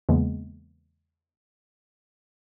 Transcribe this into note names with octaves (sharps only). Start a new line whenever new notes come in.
E2 C#3 E3 G#3 A#3 B3